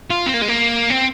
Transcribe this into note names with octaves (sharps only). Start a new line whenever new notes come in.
F4
C4
A#3
G#3
A#3
C4